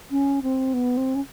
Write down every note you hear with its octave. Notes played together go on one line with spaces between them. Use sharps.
C#4
C4
B3
C4
C#4